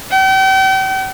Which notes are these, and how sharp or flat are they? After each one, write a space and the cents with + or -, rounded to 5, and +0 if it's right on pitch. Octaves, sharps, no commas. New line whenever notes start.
G5 -40